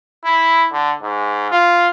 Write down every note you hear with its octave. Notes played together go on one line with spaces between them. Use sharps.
E4
D3
G#2
F4